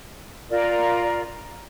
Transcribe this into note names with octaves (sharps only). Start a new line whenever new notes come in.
F4 A#4 D5